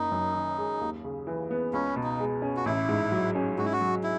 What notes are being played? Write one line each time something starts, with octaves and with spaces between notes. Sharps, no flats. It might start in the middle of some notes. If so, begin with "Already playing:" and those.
Already playing: F#1 D#4
F#2
D#3
G#3
D#2
C#3
E3
B3
C#2 C#4
B2
D#4
G#3
C#4
F#4
A1 E4
G#2
F#3
C#4
G#2 F#4
E4
F#4
F#3
E4